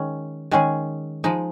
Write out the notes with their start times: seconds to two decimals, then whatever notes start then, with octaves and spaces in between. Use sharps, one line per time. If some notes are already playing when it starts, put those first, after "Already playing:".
Already playing: D#3 G#3 C#4
0.51 D#3 G#3 C#4 G#4
1.24 F3 G#3 D#4